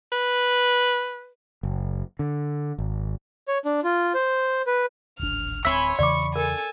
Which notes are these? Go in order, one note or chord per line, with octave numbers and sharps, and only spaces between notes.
B4
F#1
D3
G#1
C#5
D4
F4
C5
B4
D1 G#1 D4 F6
D1 C4 C#5 E5 G#5 B5 C6 E6
E2 C#3 E3 D5 C#6 D6
A4 A#4 G#5